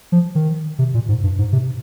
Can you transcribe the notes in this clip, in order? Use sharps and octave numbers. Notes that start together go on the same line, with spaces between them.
F3
D#3
C3
A#2
G#2
G2
G#2
C3